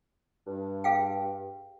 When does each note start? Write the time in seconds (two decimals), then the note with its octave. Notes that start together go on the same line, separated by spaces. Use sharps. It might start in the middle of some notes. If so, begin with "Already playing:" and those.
0.47 G2
0.84 G#4 F5 G5